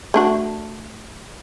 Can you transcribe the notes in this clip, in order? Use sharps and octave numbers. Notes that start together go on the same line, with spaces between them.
A3 D4 F#4